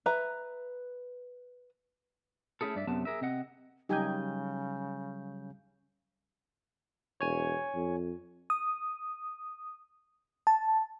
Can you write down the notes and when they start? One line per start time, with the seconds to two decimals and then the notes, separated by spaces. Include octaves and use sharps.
0.06 B4 E5 A#5
2.61 A3 C#4 E4 G#4 A4
2.75 G2 D5 E5
2.87 F#2 C3 B3 A5
3.05 G#4 A#4 E5
3.21 C3 C4 D#5 F#5
3.89 C#3 F#3 G3 D#4 G4 G#5 G6
7.21 E1 C#5 G#5
7.75 F2
8.50 D#6
10.47 A5